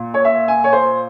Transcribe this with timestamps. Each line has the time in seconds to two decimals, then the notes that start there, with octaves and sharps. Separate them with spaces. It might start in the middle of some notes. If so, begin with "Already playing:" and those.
Already playing: A#2
0.14 C#5
0.25 E5
0.48 G#5
0.64 C#5
0.73 C5